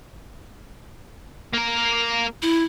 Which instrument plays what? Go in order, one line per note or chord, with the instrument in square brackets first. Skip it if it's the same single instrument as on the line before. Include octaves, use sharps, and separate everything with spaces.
[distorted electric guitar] A#3 A#4
[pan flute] E4